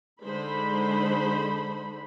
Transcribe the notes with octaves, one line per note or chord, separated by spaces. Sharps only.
D3 G#3 D#4 C5 B5